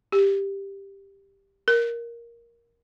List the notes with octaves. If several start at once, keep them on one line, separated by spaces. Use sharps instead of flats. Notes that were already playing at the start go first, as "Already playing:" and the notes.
G4
A#4